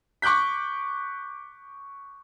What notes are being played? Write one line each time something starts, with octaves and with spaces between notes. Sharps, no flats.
C#6 D6 F#6 G6 B6